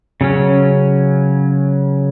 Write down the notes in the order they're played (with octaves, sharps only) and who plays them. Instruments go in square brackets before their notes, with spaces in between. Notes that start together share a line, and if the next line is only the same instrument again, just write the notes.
[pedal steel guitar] C#3 F#3 C#4